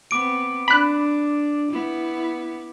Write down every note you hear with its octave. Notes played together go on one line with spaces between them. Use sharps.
B3 C4 D6 D7
D4 B5 F#6
B3 E4